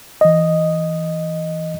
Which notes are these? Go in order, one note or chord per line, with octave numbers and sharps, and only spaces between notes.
E3 D#5